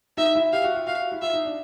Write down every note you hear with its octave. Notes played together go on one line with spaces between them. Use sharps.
D#4 E5
E4
G4 F5
F#4
F4
F#4 F5
E4
F4 E5
D#4
D4